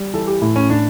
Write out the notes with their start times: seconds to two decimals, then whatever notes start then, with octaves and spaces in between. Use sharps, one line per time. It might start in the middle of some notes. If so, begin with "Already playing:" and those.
Already playing: G3
0.14 E3 A4
0.27 G4
0.42 A2 E4
0.56 C#4
0.70 A2 D4